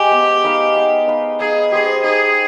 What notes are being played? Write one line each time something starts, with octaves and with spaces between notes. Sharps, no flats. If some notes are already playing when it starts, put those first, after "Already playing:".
Already playing: G#3 G4
B3
D#4 B4 F5
B3
D#4 B4 F5
D#4 G#4
G4 G#4 C5 D#5
D#4 G#4